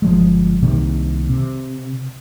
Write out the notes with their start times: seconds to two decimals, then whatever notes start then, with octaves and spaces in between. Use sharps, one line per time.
0.02 G1 F3 G#3
0.62 C2 C3 D#3 A#3
1.29 C3